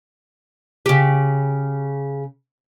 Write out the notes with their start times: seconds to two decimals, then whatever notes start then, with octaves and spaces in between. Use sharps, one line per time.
0.86 C#3 G4